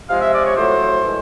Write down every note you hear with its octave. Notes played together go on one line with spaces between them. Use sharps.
C3 F3 G#3 F5
E5
D5
C#5
A2 F#3 A3 C5
A2 E3 G#3